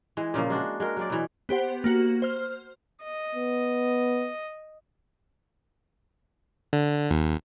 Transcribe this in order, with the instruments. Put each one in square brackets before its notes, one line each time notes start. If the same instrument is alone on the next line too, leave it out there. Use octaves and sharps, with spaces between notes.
[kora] E3 G#3
A#2 C#3 F3 A#3
G#3 D4 F#4
G#3 F#4 A#4
F#3 G#3 D5
B2 E3
[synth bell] B3 G4 C5 F#5
A#3 F#4
C5 F6
[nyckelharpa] D#5
[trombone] B3
[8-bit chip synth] D3
D#2